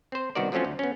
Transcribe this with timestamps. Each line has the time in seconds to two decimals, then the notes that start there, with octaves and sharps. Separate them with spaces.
0.12 C4 C5
0.35 C2 D#3 B3 F#4 A#4 D5
0.52 F3 F#3 A3 C4 C#4 F4
0.65 D2
0.79 B3 C#4